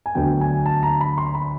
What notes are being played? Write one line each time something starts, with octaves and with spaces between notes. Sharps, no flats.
G#5
D2 D3 F#3 B3 G5
G#5
A5
A#5
B5
C6
B5